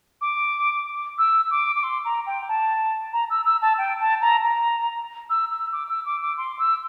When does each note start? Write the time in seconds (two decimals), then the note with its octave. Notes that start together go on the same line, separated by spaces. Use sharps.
0.21 D6
1.18 E6
1.51 D6
1.75 D6
1.83 C6
2.05 A#5
2.26 G5
2.48 A5
3.13 A#5
3.30 E6
3.45 E6
3.62 A5
3.78 G5
3.99 A5
4.21 A#5
4.43 A#5
5.30 E6
5.51 E6
5.72 D6
5.89 E6
6.05 D6
6.22 D6
6.37 C6
6.59 E6